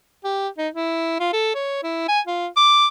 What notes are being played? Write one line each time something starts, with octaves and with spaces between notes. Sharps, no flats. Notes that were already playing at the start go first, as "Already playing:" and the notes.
G4
D#4
E4
F4
A4
C#5
E4
G#5
F4
D6